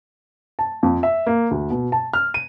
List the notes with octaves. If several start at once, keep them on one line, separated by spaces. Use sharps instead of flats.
A5
F2
E5
A#3
D2
B2
A5
F6
D#7